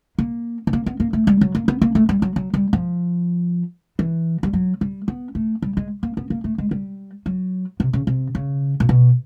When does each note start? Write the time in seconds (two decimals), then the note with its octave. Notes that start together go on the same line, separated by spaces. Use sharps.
0.18 A#3
0.67 B3
0.73 A#3
0.86 B3
1.00 A#3
1.13 A3
1.27 G3
1.41 F#3
1.55 A#3
1.68 B3
1.82 A#3
1.95 A3
2.09 G3
2.22 F#3
2.36 F#3
2.54 G3
2.73 F3
3.99 E3
4.43 G3
4.53 F#3
4.81 G3
5.08 B3
5.35 A3
5.62 G3
5.77 G#3
6.03 A#3
6.17 B3
6.30 A#3
6.44 A3
6.58 G#3
6.71 G3
7.26 F#3
7.80 C3
7.93 C#3
8.07 C3
8.35 C#3
8.80 A#2
8.89 B2